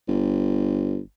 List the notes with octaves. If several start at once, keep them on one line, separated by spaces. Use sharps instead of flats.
G1